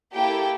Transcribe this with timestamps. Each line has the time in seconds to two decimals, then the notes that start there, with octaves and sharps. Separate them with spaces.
0.14 A#3 E4 G4 A4 G5